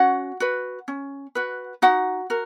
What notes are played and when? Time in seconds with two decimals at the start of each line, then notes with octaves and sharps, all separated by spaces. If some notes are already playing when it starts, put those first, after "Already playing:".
Already playing: C#4 F#4 F#5
0.40 F#4 B4
0.88 C#4
1.35 F#4 B4
1.82 D#4 F#4 F#5
2.30 F#4 A#4